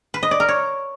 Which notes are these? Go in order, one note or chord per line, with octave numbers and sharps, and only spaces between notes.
B4
D#5
D5
A#4
C#5